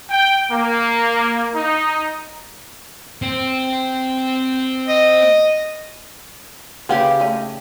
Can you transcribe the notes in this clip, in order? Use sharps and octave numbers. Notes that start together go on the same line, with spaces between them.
G5
A#3
D#4
C4
D#5
C#3 C#4 G4 B4 F#5 G5
A3 D#4